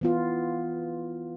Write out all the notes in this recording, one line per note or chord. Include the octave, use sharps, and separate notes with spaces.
E3 B3 F4